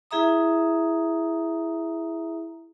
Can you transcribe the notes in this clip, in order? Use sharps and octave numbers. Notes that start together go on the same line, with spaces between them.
E4 G#4 E5 A#5 D#6